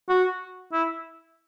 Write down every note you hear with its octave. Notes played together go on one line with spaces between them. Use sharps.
F#4
E4